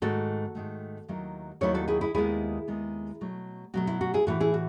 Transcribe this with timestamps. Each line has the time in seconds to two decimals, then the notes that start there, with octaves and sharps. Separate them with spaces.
0.02 G#2 D#3 A3 F#4 A4
0.55 G#2 D#3 A3
1.08 D#2 D#3 F#3 A3 E4
1.61 D#2 D#3 F#3 A3 E4 A4 C#5
1.74 F#4 A4
1.88 E4 G#4
2.01 E4 G#4
2.14 D#2 D#3 G#3 B3 E4 G#4
2.68 D#2 D#3 G#3 B3
3.21 B2 F#3 A3
3.74 B2 F#3 A3 F#4
3.87 E4
4.01 F#4
4.14 E4 G#4
4.27 A2 E3 A3 E4 F#4 A4
4.40 E4 G#4
4.54 F#4